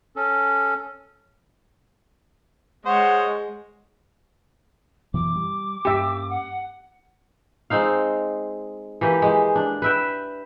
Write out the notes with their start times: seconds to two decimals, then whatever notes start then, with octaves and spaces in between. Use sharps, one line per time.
0.16 C#4 A4
2.86 G#3 C5 C#5 D#5 F#5
5.14 F#2 B2 E3 D6
5.36 G3
5.85 G2 A#3 C#4 G4 E5
6.29 F#5
7.70 G#3 C4 D#4 F5
9.01 E3 A#3 G4
9.22 G#3 G4
9.55 D4
9.82 B4 E5 G5